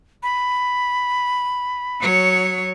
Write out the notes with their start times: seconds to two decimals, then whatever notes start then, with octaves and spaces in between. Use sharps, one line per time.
0.23 B5
2.00 F#3 C#5